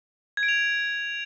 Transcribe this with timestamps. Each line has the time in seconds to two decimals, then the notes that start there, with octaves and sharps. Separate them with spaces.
0.37 G#6
0.43 D7
0.48 F7